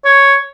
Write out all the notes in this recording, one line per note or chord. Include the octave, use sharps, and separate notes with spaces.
C#5